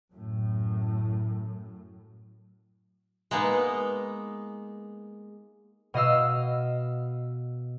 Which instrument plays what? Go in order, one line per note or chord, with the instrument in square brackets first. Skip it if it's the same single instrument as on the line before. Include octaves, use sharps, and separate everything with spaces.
[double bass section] F#2 A2
[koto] G#3 A#3 B3 D#4
[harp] B2 D#5 F5 E6